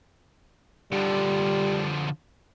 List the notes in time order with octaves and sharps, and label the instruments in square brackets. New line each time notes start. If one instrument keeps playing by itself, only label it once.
[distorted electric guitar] D3 F3 [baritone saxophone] G3